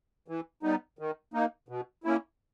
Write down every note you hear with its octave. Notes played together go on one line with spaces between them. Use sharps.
E3
G3 B3 D#4
D#3
A#3 D#4
B2
A#3 C#4 E4